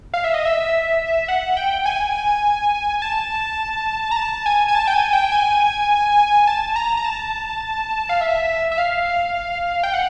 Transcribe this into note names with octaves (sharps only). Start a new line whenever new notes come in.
F5
E5
D#5
E5
F#5
G5
G#5
A5
A#5
A5
G#5
G#5
A5
G5
G#5
G5
G#5
A5
A#5
A#5
A5
F5
E5
E5
F5
G5
F#5